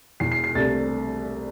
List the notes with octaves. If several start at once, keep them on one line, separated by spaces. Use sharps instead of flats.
E1 E2 E3 C7
C7
C7
C2 C3 A3 D4 A6